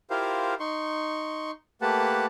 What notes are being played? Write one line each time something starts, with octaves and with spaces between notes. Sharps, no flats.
E4 F4 G4 A#4 C5 F5
D#4 C6 C#6
A3 A#3 G4 B4 F#5 A5